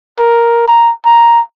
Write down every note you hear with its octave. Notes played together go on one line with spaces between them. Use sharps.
A#4
A#5
A#5